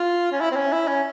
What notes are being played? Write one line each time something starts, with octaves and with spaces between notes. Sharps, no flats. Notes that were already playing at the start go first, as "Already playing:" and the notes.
Already playing: F4
C#4
E4
C4
C#4
E4
C#4